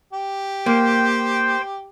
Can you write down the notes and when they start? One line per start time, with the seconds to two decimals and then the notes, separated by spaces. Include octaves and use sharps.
0.13 G4
0.66 A#3 C5 G5